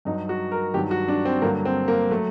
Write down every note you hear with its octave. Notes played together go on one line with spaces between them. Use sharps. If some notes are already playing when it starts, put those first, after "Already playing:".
G2 F#3 D#4
F#4
A#4
G2 D#3 F#3 G4
F#4
D4
C4
G2 D3 F#3 A#3
C4
A#3
F#3 A3